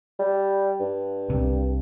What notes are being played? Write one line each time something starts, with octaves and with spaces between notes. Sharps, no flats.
G3
G2
C2 C3